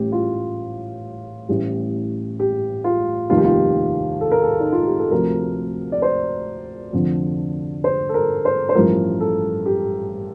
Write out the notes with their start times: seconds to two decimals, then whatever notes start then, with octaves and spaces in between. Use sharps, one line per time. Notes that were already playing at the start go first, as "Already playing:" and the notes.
Already playing: A1 A2 G3 G4
0.12 F4
1.48 A1 A2 G3
2.40 G4
2.84 F4
3.30 F1 D#2 D#3 G3 F4
3.38 G4
3.45 F4
4.21 A4
4.31 A#4
4.42 A4
4.60 D#4
4.72 F4
4.85 G4
4.99 A4
5.11 D2 C3 F3 A#4
5.92 D5
6.02 C5
6.93 F1 F2 D3 F3
7.84 C5
8.09 A4
8.14 A#4
8.45 C5
8.69 C5
8.75 A1 G2 F3 A#4
9.20 A4
9.66 G4